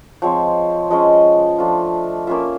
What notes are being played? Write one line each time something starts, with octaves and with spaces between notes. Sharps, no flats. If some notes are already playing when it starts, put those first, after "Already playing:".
F3 G#3 C4 C#5
F3 G#3 C#4 D#5
F3 A3 D4 F4
A#3 C#4 F4 E5